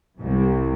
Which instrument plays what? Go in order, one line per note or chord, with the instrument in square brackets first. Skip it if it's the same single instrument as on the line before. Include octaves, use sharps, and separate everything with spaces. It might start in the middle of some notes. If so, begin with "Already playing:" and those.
[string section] C2